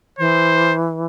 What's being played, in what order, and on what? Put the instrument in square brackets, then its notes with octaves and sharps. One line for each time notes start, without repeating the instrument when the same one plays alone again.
[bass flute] E3 [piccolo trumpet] C5